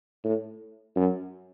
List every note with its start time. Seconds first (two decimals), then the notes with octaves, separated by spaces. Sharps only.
0.24 A2
0.96 F#2